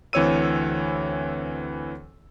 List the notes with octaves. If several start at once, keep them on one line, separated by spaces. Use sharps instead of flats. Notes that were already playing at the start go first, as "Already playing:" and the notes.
D2 E3 C4 C#5 E6 D#7